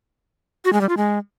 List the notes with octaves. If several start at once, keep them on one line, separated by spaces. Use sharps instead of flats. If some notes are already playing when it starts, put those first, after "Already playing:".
F#4
G#3
G3
F4
G#3